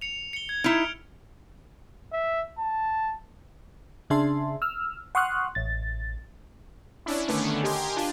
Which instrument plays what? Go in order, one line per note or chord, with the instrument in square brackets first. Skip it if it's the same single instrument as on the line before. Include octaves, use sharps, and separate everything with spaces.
[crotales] C#7 F7
C#7 G7
G#6
[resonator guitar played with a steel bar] D#4 E4 [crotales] F6 D7 F7
[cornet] E5
A5
[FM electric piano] C#3 D4 G#4 E5 A5 C6
E6 F6
F#5 C6 C#6 D#6 F6 F#6
A1 A6
[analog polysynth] C#4 D4 E4
D3 D#3 A3 B3 C#4 D4
G4 A#4 D#5 G#5 C6
D4 F4